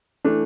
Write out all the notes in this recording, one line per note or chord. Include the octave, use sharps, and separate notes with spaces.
E3 A3 D4